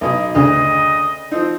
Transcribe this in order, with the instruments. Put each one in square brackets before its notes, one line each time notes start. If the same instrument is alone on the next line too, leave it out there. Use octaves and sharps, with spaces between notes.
[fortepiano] B1 B2 [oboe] D#5
[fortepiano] D2 C#3 [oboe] D#5
[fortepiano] F3 D#4 [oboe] C4